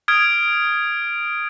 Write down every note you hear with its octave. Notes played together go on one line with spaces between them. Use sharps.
D#6 F6 G#6 D7